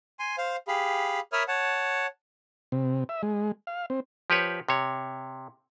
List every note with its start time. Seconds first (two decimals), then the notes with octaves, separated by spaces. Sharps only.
0.19 G#5 C6
0.38 C5 F5
0.68 G4 G#4 F5 B5
1.33 A#4 C#5 E5 B5 D#6 F6
1.48 C#5 F#5 A5
2.72 C3
3.09 E5
3.23 G#3
3.67 F5
3.90 C4
4.30 F3 G4 B4 C#5
4.69 C3 C#5